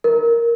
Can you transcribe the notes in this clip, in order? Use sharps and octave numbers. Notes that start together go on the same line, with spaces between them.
A#4